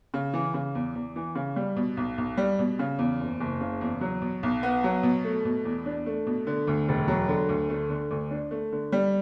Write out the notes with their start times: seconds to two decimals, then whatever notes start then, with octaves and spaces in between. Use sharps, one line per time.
0.14 C#3
0.34 E3
0.54 C#3
0.75 E2
0.95 E2
1.16 E3
1.35 C#3
1.56 G3
1.76 B2
1.97 B1
2.18 B1
2.37 G3
2.59 B2
2.79 C#3
2.99 E2
3.20 F#1
3.40 F#1
3.61 C#3
3.81 E2
4.01 F#3
4.22 B2
4.43 B1
4.63 B3
4.84 F#3
5.03 B2
5.24 A3
5.45 B2
5.65 E2
5.86 D4
6.06 A3
6.27 B2
6.47 D3
6.67 D2
6.88 E1
7.08 F#3
7.29 D3
7.49 D2
7.70 A3
7.90 D3
8.11 D2
8.31 D4
8.51 A3
8.72 D3
8.92 G3